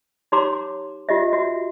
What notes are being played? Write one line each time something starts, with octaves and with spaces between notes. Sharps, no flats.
D#4 G4 C#5 A#5 C6 D6
F4 G4 D#5 E5
F#4 E5